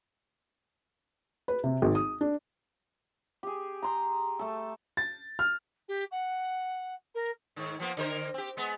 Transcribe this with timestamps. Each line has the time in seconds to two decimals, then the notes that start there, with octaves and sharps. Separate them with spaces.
1.48 B4
1.64 C3
1.82 G#1
1.95 D#6
2.21 D4
3.43 G4 G#4
3.83 A#5 C6
4.39 A3 A4
4.97 A6
5.39 F6
5.88 G4
6.11 F#5
7.15 A#4
7.56 G#2 D#3
7.80 F3 A#3 B3
7.97 D3 A#4 C5
8.34 C4 G4
8.57 G#3 B3